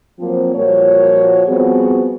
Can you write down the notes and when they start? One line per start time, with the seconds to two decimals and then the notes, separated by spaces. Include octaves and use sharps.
0.20 F3 F#3 A#3 C4
0.55 A#2 F3 G3 A#3 F#4 C#5
1.48 F3 G3 B3 C4 F#4 G#4